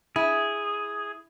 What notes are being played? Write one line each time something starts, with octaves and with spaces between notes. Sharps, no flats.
E4 G#4